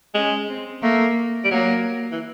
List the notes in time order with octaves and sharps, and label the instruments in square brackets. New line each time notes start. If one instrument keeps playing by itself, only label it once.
[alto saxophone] G#3 [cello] C#4
[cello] C4
[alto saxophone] A3 [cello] A#3
[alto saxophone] G3
[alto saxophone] F#3 [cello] A#3
[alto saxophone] E3